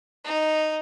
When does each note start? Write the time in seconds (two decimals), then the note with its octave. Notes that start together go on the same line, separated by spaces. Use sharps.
0.24 D#4